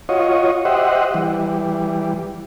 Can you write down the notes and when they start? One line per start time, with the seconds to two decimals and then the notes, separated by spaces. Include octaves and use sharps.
0.09 F4 F#4 C#5 D#5
0.65 G4 C5 D#5 E5 F#5
1.14 E3 G3